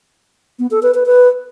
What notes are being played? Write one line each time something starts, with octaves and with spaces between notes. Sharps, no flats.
B3
A4
B4
B4
B4